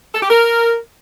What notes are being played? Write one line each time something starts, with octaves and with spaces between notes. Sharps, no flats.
A4
G4
A#4